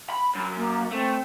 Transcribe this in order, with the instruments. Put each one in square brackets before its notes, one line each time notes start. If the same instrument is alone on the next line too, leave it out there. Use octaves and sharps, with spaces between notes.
[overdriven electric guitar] B5
F#2
[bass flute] A#3
[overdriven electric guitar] A3 [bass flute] C4